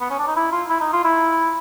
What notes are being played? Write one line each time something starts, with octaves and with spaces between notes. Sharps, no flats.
B3
C#4
D4
D#4
E4
F4
E4
D#4
F4
E4